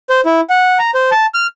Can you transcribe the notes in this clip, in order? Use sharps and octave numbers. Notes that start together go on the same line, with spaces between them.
C5
E4
F#5
A#5
C5
A5
F6